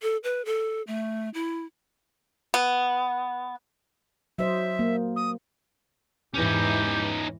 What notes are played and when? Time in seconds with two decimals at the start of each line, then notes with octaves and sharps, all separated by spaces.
0.02 A4
0.24 B4
0.45 A4
0.87 A3
1.34 E4
2.54 B3
4.38 F#3 C5 D#5 E5
4.79 A#3
5.16 D#6
6.34 E2 G#2 E3 C#4 D#4 G4